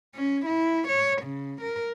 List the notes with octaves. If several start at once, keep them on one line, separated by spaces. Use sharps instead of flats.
C#4
E4
C#5
C#3
A#4